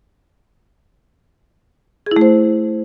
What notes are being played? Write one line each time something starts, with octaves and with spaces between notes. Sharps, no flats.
G#4
E4
A3
C5